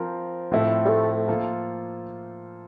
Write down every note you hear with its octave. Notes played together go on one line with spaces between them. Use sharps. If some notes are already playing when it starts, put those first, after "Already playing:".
Already playing: F3 C4 F4 A#4
A2 F3 C4 E4 A4
G3
A3
F3 A#3 F4 A4